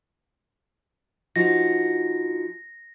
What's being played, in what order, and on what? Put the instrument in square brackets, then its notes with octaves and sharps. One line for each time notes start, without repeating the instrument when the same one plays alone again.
[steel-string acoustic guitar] F3 D#4 F#4 [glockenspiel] A#6